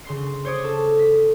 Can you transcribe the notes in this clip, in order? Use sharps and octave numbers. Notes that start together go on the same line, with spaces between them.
C#3 C6 C7
C5 C#5 D6 D#6
A4
B6